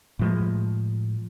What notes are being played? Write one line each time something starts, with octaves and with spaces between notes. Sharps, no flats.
A2 F3 G#3